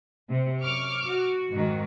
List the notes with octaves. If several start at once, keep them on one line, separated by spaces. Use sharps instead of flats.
C3
F#2 C#6 D6 F6
F#4
F2 G#2 D#3